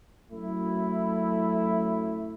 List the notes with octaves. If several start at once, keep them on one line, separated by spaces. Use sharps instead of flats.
F#2 A3 E4